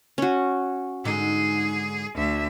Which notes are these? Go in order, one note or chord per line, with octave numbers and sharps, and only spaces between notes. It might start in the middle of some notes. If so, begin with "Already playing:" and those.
C#4 F#4
G#2 D3 D#4 G#4
D2 E5